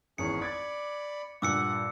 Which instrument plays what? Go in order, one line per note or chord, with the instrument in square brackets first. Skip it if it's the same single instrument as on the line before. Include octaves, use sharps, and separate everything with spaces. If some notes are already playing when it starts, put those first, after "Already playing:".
[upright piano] G#1 E2 [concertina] C#4 G#4 [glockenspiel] C#7
[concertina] D5 B5 [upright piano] D6 G#6 A6
[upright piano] G2 A#2 [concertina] F#5 [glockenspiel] D6 E6 C#7